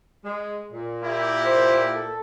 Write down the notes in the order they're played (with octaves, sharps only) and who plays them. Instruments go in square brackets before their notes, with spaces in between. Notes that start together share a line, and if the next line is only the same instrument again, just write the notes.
[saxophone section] G#3
A#2
[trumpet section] A#3 E4 G4
[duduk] C5
A4